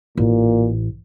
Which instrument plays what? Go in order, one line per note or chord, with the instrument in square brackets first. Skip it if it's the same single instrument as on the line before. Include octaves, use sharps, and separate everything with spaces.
[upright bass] A1 [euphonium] A#2